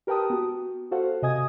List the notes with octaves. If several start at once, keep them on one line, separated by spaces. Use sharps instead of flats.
G4 A#4 B4 G5 A5 D#6
B3 F#4
F#4 A4 C5 F5 F#5
C3 D#5 G#5 D#6 G#6